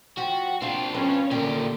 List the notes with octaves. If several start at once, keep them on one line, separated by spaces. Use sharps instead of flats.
F3 F#4 G4
C4 D4 F4
B3 C#4 C#5
A#2 D3 G4 A#4